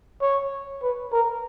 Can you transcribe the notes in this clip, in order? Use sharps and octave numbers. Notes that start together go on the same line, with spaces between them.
C#5
B4
A#4